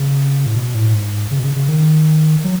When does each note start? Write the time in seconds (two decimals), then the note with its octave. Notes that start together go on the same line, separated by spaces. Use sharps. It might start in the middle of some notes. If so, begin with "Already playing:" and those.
Already playing: C#3
0.46 A2
0.56 B2
0.75 A2
0.94 G#2
1.31 C#3
1.39 B2
1.44 C#3
1.56 C#3
1.68 D#3
2.44 F#3